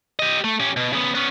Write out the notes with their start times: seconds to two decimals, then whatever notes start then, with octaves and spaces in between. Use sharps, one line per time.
0.19 G4 D#5
0.44 A3
0.60 C#4 G4
0.77 B2
0.92 C#3 B3
1.15 B3 C#4